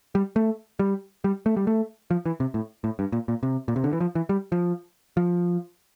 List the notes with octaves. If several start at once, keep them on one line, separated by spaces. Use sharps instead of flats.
G3
A3
G3
G3
A3
G3
A3
F3
E3
C3
A2
A2
G2
A#2
A#2
C3
A#2
C3
D3
E3
F3
E3
G3
F3
F3